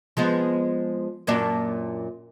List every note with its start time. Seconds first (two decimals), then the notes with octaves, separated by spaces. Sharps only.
0.17 F3 G#3 B3
1.27 F#2 A#2 D4